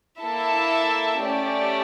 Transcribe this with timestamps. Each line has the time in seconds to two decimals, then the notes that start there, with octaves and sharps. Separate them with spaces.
0.21 A#3 E4 A4 E5 A5
1.21 A3 C#4 G4 D5